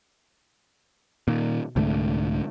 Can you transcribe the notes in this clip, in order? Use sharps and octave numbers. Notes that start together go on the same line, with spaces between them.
A#2 D#3
C2 G#2 D3 A3